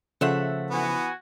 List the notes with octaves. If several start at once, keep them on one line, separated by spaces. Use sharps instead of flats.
C#3 F3 A3 C5 E5 F#5
E3 B3 F#4 G#5